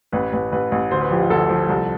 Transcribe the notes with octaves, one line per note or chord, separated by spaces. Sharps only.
A1 B4
A1 B4
A1 B4
A1
D2 C5
B4
F3 G4
F4
D2 A4
F3
C2